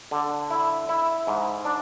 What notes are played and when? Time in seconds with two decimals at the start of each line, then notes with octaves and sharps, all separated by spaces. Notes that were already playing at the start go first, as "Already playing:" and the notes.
0.11 D3
0.50 E4
0.89 E4
1.27 G#2
1.65 D4